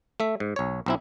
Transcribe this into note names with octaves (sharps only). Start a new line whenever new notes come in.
A3 E5
G#2
B1 C#5
B1 C4 E4